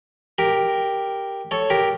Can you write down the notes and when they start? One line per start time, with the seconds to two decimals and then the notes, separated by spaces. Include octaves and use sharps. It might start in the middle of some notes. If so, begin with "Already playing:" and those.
0.38 G4 A#4
1.51 A4 C#5
1.70 G4 A#4